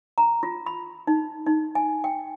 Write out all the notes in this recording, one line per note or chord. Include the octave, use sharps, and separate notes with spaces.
A#5
F4
B5
D#4
D#4
G#5
G5